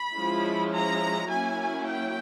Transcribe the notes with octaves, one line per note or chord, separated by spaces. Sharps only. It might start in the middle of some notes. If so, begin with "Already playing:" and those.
Already playing: B5
F3 G#3 C#4 E4
A#5
F#3 A#3 C#4 E4 G#5
G5